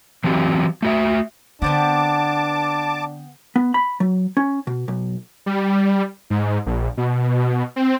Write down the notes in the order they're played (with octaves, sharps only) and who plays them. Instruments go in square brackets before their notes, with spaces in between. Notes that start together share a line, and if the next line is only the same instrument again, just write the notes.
[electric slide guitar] E3 F#3 C4 G4
A3 F#4 E5
[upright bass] D3 [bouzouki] B3 C4 F#5 [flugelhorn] D4 [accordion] A5 D6
[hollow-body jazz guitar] B3
B5
F#3
C#4
B2
B1
[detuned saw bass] G3
G#2
A#1
B2
C4